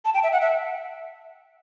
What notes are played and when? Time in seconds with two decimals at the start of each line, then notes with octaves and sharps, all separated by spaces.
0.05 A5
0.14 G5
0.23 E5
0.33 F#5
0.41 E5